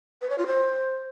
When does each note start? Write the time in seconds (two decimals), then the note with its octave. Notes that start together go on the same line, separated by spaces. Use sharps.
0.21 B4
0.30 C#5
0.38 F4
0.47 C5